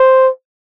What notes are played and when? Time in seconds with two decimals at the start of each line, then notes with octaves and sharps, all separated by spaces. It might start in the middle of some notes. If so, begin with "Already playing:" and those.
Already playing: C5